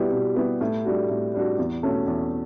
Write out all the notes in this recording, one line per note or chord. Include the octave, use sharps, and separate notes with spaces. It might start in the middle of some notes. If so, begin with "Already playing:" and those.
Already playing: B2 G3 B3 E4 G4
B2
G3 B3 E4 G4
A2
G3 D4 F#4
A2
G3 D4 F#4
E2
B2 A3 C#4
E2